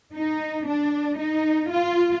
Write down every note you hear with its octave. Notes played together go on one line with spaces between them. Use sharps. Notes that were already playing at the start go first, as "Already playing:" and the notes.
D#4
D4
D#4
F4